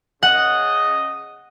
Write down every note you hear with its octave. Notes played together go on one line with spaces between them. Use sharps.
C#3 D#5 F#5